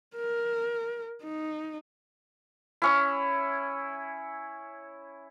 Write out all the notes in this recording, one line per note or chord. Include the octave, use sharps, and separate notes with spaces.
A#4
D#4
C#4 E4